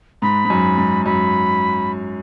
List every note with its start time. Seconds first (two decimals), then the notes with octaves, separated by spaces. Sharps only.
0.22 G#2 B5
0.45 G#2
0.50 F#2
0.78 G#2
1.06 F#2 B5